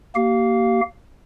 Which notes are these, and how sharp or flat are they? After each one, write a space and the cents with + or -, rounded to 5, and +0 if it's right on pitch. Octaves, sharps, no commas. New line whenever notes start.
A#3 +0 G4 -30 F5 +0